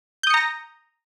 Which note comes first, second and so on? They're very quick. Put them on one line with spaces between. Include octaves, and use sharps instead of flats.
G6 D#6 C#7 A#5 A#6